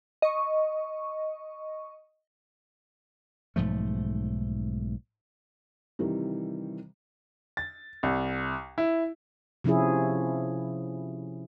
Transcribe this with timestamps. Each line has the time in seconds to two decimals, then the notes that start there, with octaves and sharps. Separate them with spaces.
0.22 D#5 C#6
3.56 B1 G#2 F3 A3
5.99 C3 D#3 E3 G3
7.57 A6
8.03 C2
8.78 E4
9.64 C3 F3 C#4 E4 G#4